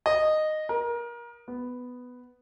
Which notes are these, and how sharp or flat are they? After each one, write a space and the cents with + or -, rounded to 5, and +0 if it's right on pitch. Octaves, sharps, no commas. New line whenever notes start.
D#5 -10
A#4 +25
B3 +5